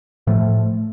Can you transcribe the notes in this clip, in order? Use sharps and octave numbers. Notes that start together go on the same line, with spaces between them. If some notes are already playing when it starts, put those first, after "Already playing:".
A2 F3 A3